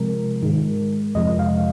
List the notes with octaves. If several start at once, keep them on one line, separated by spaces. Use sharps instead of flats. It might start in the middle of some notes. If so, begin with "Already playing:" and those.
Already playing: C3 F3 G#3 A#4
G#2 D#3 G#3
F2 C3 F3 G#3 D#5
F5